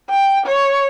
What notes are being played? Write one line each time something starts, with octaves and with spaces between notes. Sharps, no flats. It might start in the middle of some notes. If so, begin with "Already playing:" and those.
G5
C#5